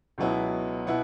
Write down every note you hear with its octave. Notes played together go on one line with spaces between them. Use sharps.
C#2 B2 F#3 B3 E4
B2 B3 E4 F#5